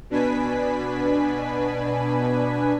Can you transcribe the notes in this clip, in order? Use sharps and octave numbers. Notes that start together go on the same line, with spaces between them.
B2 D4 B4 G#5 B6